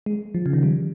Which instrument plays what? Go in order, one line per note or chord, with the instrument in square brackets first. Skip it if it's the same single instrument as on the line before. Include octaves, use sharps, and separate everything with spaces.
[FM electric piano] G#3
F3
C#3
D#3
G3